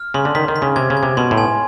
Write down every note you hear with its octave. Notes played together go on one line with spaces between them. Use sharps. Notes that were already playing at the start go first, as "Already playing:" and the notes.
Already playing: F6
C#3 C6
D3
D#3 B6
D#3
B6
C#3
C3 G#6
C#3
G#6
C3
B2 C6
A2
G#5